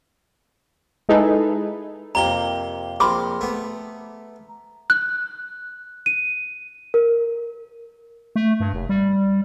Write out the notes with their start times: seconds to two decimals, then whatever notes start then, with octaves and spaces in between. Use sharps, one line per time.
1.09 G#3 D#4 E4 G#4 A4 B4
2.15 F2 C3 A#3 A#5 G7
3.00 A#1 C3 A#4 B5 C6 D6
3.41 A3 B3
4.90 F#6
6.06 D#7
6.94 A#4
8.36 A3
8.60 G2
8.74 F1
8.89 G3